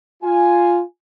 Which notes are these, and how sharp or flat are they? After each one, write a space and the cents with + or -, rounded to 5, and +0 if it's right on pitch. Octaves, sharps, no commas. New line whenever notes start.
F4 +0 G#5 +0